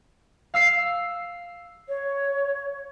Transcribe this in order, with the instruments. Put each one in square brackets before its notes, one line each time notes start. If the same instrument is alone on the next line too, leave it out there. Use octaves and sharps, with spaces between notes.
[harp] F5 E6 C7
[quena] C#5